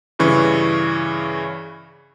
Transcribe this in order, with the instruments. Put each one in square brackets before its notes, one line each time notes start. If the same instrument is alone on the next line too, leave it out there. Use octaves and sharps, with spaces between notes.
[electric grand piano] G2 C#3 E3 C#6